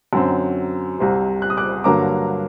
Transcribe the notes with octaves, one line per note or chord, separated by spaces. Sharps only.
F#2 D3 F#3 C4
C2 C3 G3
F#6
D#6
D6 F#6
G2 D3 F#3 A#3 A#5 D6